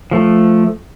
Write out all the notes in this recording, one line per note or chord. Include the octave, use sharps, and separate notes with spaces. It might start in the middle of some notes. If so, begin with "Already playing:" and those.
F3 A3